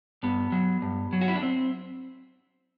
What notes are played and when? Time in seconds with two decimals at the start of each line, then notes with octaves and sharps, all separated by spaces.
0.23 G2 B3
0.52 F#3
0.82 G2
1.13 F#3
1.21 F#4
1.28 E4
1.35 D4
1.42 C4